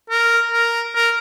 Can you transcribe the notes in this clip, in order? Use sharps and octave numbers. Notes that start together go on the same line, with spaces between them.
A#4
A#4
A#4